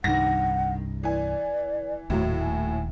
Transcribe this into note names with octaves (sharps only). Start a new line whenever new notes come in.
C2 G2 D#3 F#5 A#6
E3 D5 G#5
D#1 D#2 A2 F#3
G#5